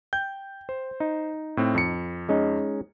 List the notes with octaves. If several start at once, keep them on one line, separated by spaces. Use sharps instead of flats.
G5 G6
C5
D#4
A2 C4
F2 C#7
G#3 C#4 D#4